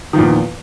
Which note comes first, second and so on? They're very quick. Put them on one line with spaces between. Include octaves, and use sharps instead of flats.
D#3 F3 A#2 E2